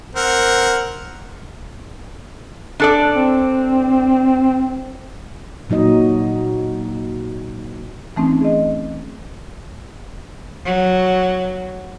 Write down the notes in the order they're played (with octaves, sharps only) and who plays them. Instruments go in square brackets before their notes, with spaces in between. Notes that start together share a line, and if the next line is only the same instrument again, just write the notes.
[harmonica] C4 A#4 F#5
[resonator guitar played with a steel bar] D4 A4 D5
[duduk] C4
[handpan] A#2 F#3 D#4 D#5
[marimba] E3 A3 C4 C#4 D#4
G#4 D#5
[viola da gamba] F#3